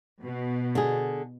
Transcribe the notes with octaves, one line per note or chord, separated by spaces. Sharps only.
B2
D3 G#4